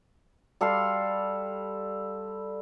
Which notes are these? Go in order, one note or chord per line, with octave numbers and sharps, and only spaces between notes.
G3 A4 F5 C6